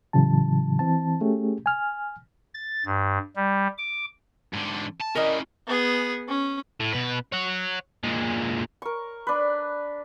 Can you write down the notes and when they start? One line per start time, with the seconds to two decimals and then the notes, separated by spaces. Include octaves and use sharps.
0.13 A2 C#3 E3 F#3 A5
0.79 E3 C4 A5
1.21 A3 C#4 G4 G#4
1.66 G#5 F6
2.54 A6
2.86 G2
3.36 G3
3.78 D6
4.54 G#2 D3
5.01 A5
5.15 C#4 E4 A#4 D5 D#5
5.67 B3 G#4
6.28 C#4
6.80 A2
6.93 B2 B4
7.32 C#5 F#5
8.04 A#2 G#3
8.82 A#4 C#6
9.27 D4 B4